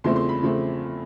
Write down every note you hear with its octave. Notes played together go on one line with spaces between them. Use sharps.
E2 C#3 F3 A3 C4 C6
C6
B5
C#3 F3 A3 C4